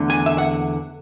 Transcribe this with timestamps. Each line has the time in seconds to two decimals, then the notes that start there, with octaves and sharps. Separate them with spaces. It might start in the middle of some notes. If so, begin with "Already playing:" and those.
Already playing: E2 D3 A3 D4
0.10 G#5
0.26 E5
0.38 F#5